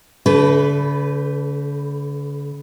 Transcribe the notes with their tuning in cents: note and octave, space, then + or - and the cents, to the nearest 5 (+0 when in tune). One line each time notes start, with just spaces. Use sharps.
D3 -45 A3 -5 B4 +0